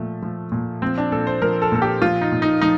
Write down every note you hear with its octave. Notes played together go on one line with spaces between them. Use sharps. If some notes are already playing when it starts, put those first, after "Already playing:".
Already playing: A#2 F3 A3
F3
A#2
F3 C4
D4
A#2 A4
C5
F3 A#4
A4
A#2 A4
G4
F3 F4
D#4
A#2
D#4
F3 D#4